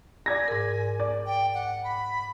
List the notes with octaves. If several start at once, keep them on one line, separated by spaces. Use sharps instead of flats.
D5 G#5 G#6 A#6
G#2 A#4
D5
G5
F#5
B5